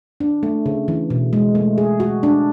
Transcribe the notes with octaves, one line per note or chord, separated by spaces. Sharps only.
D4
A3
C#3
E3
B2
G#3
A3
G#4
F#4
D4